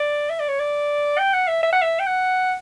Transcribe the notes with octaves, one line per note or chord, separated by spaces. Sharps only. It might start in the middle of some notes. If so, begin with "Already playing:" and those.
Already playing: D5
E5
D5
C#5
D5
G5
F#5
E5
E5
F#5
E5
G5
F#5